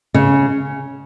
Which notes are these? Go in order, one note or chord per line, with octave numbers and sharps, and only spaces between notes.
C#3